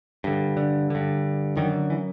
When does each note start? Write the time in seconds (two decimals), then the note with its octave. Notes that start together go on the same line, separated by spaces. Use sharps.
0.24 G2 D3
0.57 D3
0.90 G2 D3
1.56 F#2 D3 D#3
1.90 E3